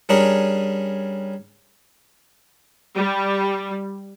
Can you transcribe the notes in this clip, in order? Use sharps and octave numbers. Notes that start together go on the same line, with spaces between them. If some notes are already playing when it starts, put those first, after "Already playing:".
G3 C#4 D4 G#4 A#4 C#5
G3